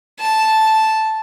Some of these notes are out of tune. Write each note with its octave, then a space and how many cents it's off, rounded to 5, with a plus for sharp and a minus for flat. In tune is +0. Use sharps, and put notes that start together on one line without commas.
A5 -5